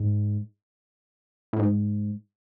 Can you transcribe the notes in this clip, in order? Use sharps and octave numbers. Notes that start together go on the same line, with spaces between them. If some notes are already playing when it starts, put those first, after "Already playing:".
Already playing: G#2
A2
G#2